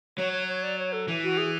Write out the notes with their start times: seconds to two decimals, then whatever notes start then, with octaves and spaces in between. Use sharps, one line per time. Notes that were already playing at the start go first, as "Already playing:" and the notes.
0.18 F#3 C#5
0.33 C#5
0.48 C#5
0.63 D5
0.78 C#5
0.93 A4
1.08 E3
1.23 F#4
1.38 G#4